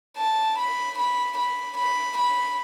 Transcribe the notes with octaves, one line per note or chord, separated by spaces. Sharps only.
A5
B5
B5
B5
B5
B5